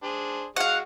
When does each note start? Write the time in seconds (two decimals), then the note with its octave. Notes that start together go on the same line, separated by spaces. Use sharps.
0.03 D4 G#4 C5
0.56 G#3 F#4 F5 F#5